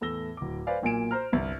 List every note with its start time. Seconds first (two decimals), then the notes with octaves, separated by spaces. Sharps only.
0.01 E2 A2 A3 E6 A#6 G7
0.37 D1 D6
0.67 B4 C5 D5 F5 G#5
0.82 B1 A#2 A#3 G#5 D7 E7
1.11 C5 A#5 F6
1.32 G1 C2